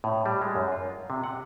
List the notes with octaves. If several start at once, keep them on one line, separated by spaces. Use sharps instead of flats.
A2
G3
G#3
F#2
F4
C3
F#5